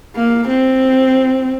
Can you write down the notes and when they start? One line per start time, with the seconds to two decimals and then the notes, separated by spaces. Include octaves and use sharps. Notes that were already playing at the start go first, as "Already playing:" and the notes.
0.16 A#3
0.48 C4